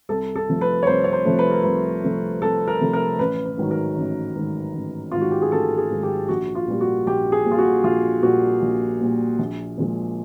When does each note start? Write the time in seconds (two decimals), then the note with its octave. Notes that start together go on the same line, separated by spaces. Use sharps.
0.09 C2 A4
0.36 A4
0.49 C3 F3 A3
0.61 B4
0.83 C#5
0.87 C2 C5
1.04 C#5
1.13 C5
1.25 C3 F3 A3
1.39 B4
1.51 A#4
1.64 C2 B4
2.04 C3 F3 A3
2.42 C2 A4
2.68 A#4
2.81 C3 F3 A3
2.93 A#4
3.19 A1 B4
3.45 B4
3.58 G#2 D#3 F#3
3.71 A#4
3.97 A1
4.35 G#2 D#3 F#3
4.74 A1
5.12 G#2 D#3 F#3 F4
5.21 F#4
5.31 G4
5.42 G#4
5.52 A1 A4
5.78 G#4
5.91 G#2 D#3 F#3
6.03 G4
6.29 A#1 F#4
6.55 F4
6.68 A#2 G3 A#3
6.81 F#4
7.07 A#1 G4
7.32 G#4
7.45 A#2 G3 A#3
7.51 F4
7.58 F#4
7.84 A#1 F4
8.22 A#2 G3 A#3 F#4
8.62 A#1
9.00 A#2 G3 A#3
9.39 A#1
9.78 A#2 F3 G#3